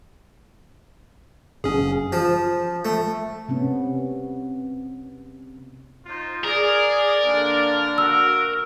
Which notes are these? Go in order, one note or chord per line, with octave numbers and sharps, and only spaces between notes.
F#1 C#4 G#4
F3
A3
C3 B3 C#4
D#4 F4 C5
G#4 A#4 D5
D3 A#3 D4
F#4 E6